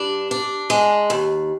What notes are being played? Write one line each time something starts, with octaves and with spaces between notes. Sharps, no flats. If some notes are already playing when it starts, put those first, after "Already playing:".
Already playing: G2 D4
D4
G#3
D#2